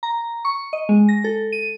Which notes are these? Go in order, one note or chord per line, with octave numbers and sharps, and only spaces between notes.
A#5
C#6
D#5
G#3
A#6
A4
D#7